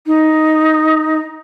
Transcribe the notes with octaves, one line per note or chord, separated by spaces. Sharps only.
D#4